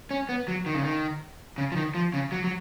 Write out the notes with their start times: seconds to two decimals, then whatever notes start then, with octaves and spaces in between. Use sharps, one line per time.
0.11 C#4
0.29 B3
0.48 F#3
0.66 D#3
0.75 C#3
0.83 D#3
1.58 C#3
1.72 F3
1.76 D#3
1.95 F3
2.14 C#3
2.32 F#3
2.44 F#3